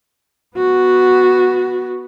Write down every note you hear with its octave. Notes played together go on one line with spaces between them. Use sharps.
B3 F#4